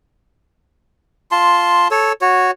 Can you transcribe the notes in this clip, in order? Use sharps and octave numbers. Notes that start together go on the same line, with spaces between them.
F4 A5 C6
A4 C#5
F#4 C#5